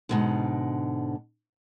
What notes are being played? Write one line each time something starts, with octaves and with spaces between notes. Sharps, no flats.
G#2 B2 D3